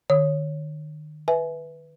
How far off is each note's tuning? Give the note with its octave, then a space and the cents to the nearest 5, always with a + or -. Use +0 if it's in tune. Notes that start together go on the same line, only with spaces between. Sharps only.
D#3 -35 C#5 +0 D#6 +0
B4 +0 E5 -5 G#5 +25